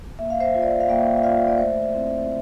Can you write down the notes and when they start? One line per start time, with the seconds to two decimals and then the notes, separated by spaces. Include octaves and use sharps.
0.19 A#3 E5
0.30 F5
0.40 C5 E5
0.54 F4
0.62 D5
0.72 E5
0.80 F5
0.89 A#3 E5 G5
1.17 E5
1.23 F4 D5 F5
1.48 D5
1.58 A3 C5 E5
1.93 C4 E4